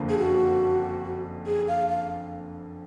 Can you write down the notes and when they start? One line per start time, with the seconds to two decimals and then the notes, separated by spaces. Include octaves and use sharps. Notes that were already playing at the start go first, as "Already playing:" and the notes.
Already playing: F#1 F2 D3 F3 A#3
0.09 G#4
0.18 F#4
1.46 G#4
1.68 F5
1.89 F5